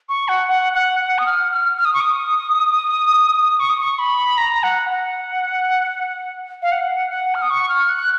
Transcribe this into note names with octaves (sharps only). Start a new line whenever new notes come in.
C#6
F#5
F#5
F#5
F#5
D#6
F6
F6
F6
D#6
C#6
D#6
C#6
D#6
C#6
B5
A#5
F#5
F#5
F5
F#5
F#5
F6
D#6
C#6
F6
F#6